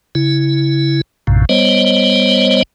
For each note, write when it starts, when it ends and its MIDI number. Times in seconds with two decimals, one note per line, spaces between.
0.15 1.01 49
0.15 1.01 64
1.27 1.45 34
1.27 1.45 42
1.27 1.45 45
1.27 1.45 48
1.49 2.63 55
1.49 2.63 59
1.49 2.63 72
1.49 2.63 73
1.49 2.63 75